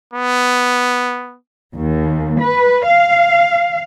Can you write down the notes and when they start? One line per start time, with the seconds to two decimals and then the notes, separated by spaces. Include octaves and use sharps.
0.13 B3
1.75 D#2
2.39 B4
2.86 F5